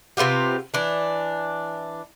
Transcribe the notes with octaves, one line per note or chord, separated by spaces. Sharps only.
C3 B3 F4 G4
E3 D4